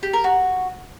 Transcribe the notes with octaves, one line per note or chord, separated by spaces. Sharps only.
G4
A#4
F#4